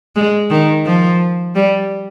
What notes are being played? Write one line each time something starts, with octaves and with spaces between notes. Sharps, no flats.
G#3
D#3
F3
G3